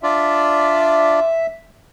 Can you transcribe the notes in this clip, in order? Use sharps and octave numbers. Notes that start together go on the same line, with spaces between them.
D4 F4 D5 E5